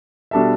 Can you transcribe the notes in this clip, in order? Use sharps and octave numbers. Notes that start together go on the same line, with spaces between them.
B2 G3 D4 A4 E5